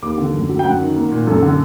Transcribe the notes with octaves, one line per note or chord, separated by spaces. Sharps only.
D#2 D6
D3
F#2
F#3
G5
F#2 F#5
D#3
A#3
A#2
F#2 A4
D3